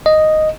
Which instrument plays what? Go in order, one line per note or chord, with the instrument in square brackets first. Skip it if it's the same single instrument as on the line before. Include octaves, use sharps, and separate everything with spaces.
[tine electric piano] D#5